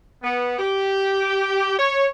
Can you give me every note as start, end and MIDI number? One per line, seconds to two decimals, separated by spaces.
0.22 0.54 59
0.58 1.76 67
1.77 2.06 73